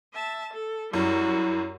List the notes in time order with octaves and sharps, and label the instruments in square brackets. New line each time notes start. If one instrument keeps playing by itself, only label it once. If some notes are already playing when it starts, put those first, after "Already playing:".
[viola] E5 A5
A4
[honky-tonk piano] F#2 [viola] G3 F#4 [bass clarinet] E4